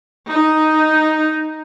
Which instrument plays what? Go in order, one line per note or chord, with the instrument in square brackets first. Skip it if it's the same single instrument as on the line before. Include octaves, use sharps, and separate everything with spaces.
[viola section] D#4